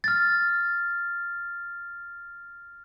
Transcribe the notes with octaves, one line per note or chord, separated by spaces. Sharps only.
F6 A6